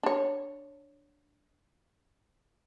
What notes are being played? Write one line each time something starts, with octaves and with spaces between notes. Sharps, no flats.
D4 C#5